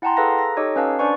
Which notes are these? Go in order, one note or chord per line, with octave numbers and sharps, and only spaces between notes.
E4 F#5 G5 A5 A#5 C6
G#4 A4 B4 F5 A#5 A#6
A#6
D#4 G4 A4 C#5 D#5
C#4 B4 F5 A5
D4 B4 C5 D5 G#5 C#6